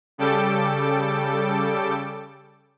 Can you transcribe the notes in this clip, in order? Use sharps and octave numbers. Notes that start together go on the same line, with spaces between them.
C#3 G3 A4 G5 D6